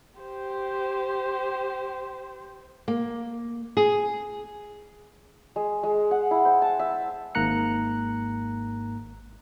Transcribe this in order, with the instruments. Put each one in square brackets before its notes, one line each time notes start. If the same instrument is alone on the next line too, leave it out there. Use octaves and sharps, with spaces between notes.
[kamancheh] G4 C5
[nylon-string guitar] A#3
G#4
[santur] G#3
G#3
F#5
E4
C5
A5
E5
[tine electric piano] G#1 G#2 A#3 A#5 F#6 C#7